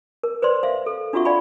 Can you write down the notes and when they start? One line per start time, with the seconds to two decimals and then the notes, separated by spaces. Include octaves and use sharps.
0.23 A#4
0.42 B4 C5 D5 C6
0.63 C5 E5 F5
0.86 A4
1.13 D4 F4 F#4 E5 F#5 C#6
1.25 D5 F5 G#5 B5